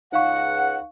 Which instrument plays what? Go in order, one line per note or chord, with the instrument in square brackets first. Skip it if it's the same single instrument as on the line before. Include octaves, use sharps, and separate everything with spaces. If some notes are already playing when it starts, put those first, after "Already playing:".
[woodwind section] C#2 F#5 [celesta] D#4 F5 C#6